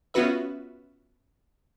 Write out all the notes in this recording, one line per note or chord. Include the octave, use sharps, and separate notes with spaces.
B3 C#4 F4 F#4 B4 E5